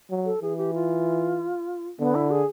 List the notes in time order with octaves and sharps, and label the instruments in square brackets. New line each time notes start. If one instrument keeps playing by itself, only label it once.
[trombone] F#3
[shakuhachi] A4
[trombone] E3 [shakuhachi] G#4
[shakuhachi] G4
F4
[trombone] D3 [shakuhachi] B3
[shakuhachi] E4
G#4